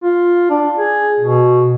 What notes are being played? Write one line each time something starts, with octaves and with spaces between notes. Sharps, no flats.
F4
D4
G#4
B2